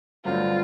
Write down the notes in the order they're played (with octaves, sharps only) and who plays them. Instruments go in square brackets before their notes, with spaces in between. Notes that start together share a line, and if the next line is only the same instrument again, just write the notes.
[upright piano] G2 D3 F#3 A3 C4 [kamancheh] F4